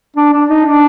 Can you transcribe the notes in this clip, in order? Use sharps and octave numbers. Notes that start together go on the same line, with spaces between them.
D4
D4
D#4
D4